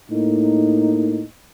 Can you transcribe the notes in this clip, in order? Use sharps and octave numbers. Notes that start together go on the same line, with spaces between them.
A2 A#3 D#4